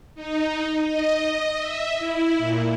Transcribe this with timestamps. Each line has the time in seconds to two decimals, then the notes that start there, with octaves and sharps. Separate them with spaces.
0.15 D#4
0.81 D#5
1.57 E5
1.98 E4
2.38 A#2